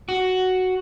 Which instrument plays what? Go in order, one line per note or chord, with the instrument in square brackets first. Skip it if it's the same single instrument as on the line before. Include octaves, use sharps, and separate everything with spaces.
[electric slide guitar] F#4